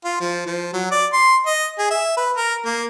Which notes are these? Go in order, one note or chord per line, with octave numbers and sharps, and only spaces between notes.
F4
F3
F3
F#3
D5
C6
D#5
G#4
E5
B4
A#4
A#3